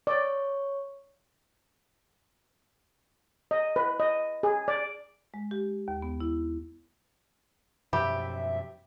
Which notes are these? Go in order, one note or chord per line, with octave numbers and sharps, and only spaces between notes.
C#5 D5 C#6
D#5
B4
D#5
G#4
D5
G#3
G4
D#2
B3
E4
F#2 B2 F3 G4 E5 B5